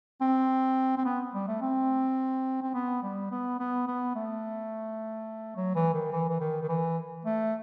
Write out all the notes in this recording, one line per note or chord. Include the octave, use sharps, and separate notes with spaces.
C4
C4
B3
G3
A3
C4
C4
B3
G3
B3
B3
B3
A3
F#3
E3
D#3
E3
E3
D#3
D#3
E3
A3